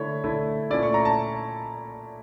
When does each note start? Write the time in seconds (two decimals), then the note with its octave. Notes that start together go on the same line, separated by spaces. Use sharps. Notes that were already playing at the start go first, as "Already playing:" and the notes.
Already playing: D3 A3 E4 C#5
0.24 D3 A3 E4
0.70 A#2 A3 C#4 E4 D5
0.83 C#6
0.94 A#5
1.05 A5